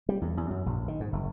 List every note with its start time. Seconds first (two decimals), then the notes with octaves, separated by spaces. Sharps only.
0.09 G3
0.22 E2
0.37 E2
0.50 F#2
0.66 A#1
0.88 D#3
1.00 G#2
1.12 F#1